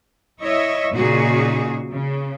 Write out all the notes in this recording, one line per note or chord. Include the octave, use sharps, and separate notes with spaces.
E4 C#5 D#5 E5
A#2 C#3 D#4 F#4 G#4
C#3